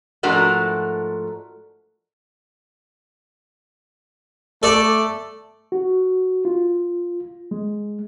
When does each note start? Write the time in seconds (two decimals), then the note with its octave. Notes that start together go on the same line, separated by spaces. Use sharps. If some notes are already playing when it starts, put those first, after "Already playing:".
0.23 G#2 F3 A3 D4 F#4 A#4
4.63 A3 A4 D5
5.72 F#4
6.45 F4
7.51 G#3